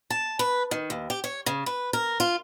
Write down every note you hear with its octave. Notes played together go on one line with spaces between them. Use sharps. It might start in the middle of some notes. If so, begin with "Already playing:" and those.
A5
B4
D#3
D#2
G4
C#5
C#3
B4
A#4
F4